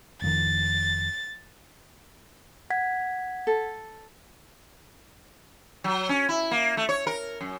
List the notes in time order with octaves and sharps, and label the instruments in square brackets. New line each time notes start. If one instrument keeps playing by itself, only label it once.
[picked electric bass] F1 F2 D#3 [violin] A6
[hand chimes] F#5 G#6 B6
[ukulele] A4
[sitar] F#3
C#4
E4
A#3
A3
C#5
A#4
F#2